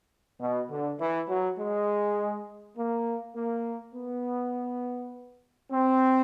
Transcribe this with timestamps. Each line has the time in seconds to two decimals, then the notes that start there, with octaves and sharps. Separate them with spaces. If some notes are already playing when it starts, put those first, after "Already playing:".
0.40 B2
0.70 D3
1.00 E3
1.29 F#3
1.58 G#3
2.77 A#3
3.35 A#3
3.94 B3
5.71 C4